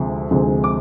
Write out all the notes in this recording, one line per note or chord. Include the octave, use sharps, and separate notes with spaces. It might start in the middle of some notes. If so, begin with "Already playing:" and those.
Already playing: D2 C3 F3 G#3
D2 C3 F3 G#3
D6